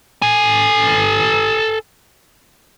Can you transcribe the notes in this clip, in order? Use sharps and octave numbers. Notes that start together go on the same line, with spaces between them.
A4 G#5